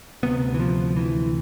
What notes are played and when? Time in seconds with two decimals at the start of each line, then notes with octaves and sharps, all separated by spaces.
0.23 D2 C3 B3
0.54 E3
0.60 F3
0.96 E3